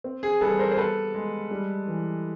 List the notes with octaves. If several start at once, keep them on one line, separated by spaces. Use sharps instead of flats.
C4
G#4
G3 A4 B4
A#4 C5
C5
B3 A4 B4
G#3
G3
E3